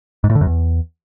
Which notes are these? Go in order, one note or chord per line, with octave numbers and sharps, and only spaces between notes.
G#2
A2
D3
F#2
E2